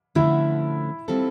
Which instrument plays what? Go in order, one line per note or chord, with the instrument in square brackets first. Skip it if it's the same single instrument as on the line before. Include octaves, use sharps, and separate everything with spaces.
[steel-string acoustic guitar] D3 F3 A3 C#4 F#4 [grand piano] E4
[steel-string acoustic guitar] G3 C4 F4 A4